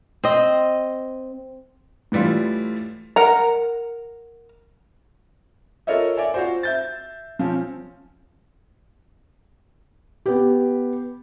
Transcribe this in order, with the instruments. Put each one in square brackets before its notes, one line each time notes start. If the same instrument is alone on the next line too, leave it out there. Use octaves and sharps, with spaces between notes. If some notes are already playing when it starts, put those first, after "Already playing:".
[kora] C4 D#5
[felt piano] A2 E3 G3 E4 F4
[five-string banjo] A#4 F#5 A#5
[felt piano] F4 A4 A#4 C#5 D#5 E5
D5 E5 G#5
F4 F#4 C5
E5 G6 A6
F3 C4 C#4
B3 G4